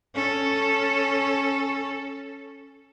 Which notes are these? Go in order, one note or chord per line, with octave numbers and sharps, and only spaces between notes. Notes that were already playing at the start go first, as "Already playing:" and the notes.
C#4 A4